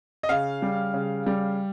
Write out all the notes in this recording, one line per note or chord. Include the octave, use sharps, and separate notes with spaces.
D#5
C#3 F5
G3
C#3
G3